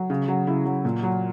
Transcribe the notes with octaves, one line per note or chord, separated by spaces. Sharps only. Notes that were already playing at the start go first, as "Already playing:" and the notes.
Already playing: F#3
C#3
F#3
C#3 E4
F#3
A#2
F#3